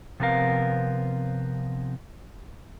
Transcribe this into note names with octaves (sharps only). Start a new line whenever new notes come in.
C3 F3 B3 C4 A#4 F5